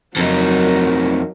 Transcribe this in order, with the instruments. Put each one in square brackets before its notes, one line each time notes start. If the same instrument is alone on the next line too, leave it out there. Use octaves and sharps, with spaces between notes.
[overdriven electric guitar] F2 D#4 [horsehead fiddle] F#3 A#4